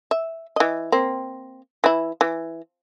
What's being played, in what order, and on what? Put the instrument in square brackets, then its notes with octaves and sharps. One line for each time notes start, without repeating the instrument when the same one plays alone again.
[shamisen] E5
E3 D#5
A#3 C4
E3 E4
E3